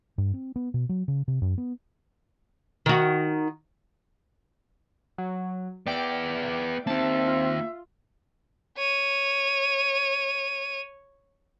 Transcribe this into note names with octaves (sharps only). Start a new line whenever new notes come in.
G2
C4
B3
B2
F#3
C#3
C3
F#2
B3
D#3 F#4
F#3
B3 D5 E5 G5 D6
A#3 C4 D#4 E5 A5
F4
C#5 D#7